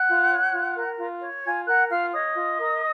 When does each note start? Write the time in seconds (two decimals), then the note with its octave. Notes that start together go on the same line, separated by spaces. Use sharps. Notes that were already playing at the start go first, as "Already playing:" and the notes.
Already playing: F#5 F#6
0.08 F4
0.30 C#5
0.54 F4
0.76 A#4
0.99 F4
1.22 C#5
1.44 F4 G#5 G#6
1.67 A#4 F#5 F#6
1.90 F4 F5 F6
2.13 C#5 D#5 D#6
2.35 F4
2.58 A#4